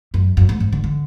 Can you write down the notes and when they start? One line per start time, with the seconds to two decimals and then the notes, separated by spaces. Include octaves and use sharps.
0.14 F#2
0.37 F#2
0.49 G#2
0.60 G#2
0.73 D3
0.84 D3